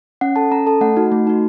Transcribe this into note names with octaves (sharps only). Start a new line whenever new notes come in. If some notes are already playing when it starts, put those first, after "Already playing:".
C#4 F#5
A4 A5
C#4 A#5
A4 A5
A3 F#5
D#4 F#4
A3
D#4 F#4